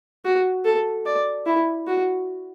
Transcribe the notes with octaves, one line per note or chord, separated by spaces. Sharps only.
F#4
A4
D5
E4
F#4